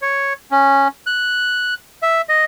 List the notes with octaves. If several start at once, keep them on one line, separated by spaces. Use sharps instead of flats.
C#5
C#4
F#6
E5
D#5